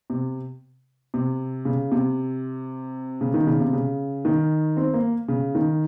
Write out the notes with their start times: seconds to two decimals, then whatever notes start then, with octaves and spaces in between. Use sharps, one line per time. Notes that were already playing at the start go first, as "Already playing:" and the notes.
0.10 C3
1.14 C3
1.65 C#3
1.92 C3
3.21 C#3
3.34 D#3
3.47 C#3
3.60 C3
3.73 C#3
4.25 D#3
4.77 C4
4.94 A#3
5.28 C#3
5.55 D#3